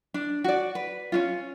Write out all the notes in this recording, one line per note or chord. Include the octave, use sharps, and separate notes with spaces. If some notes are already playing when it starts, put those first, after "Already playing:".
D4
F#4 D5
B4
C#4 D4 F4